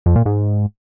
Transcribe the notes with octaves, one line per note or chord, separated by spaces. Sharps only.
F2
A#2
G#2